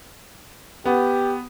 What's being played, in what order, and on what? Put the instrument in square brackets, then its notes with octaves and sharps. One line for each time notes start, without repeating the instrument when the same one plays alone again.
[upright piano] B3 [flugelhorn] G4